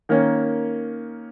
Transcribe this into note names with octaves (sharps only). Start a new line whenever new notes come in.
D#3 A#3 C#4